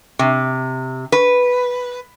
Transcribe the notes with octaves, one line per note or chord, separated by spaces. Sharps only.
C3
B4